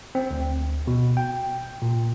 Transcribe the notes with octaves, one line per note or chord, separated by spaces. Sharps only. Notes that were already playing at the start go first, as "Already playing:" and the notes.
C4
D2
B2
G5
A#2